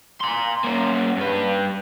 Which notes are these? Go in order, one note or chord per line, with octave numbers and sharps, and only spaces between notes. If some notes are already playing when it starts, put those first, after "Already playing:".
A#5 C6
A#3 C#4
G2 B4